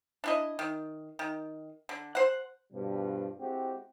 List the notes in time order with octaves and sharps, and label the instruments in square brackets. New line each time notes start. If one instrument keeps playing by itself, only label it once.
[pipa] D4 E4 D#5
D#3
D#3
D3
C5 F#5
[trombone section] G2 B2 F3 G3 D4
G#3 C4 E4 F#4 G4